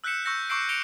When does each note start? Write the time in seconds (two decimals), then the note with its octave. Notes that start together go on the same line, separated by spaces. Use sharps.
0.04 E6 F#6 G6 B6 C#7 E7
0.25 C#6 E6 G6 A#6 C#7
0.49 C#6 D6 E6 G6 C7 D7
0.69 G6 C#7 D7 F7 G7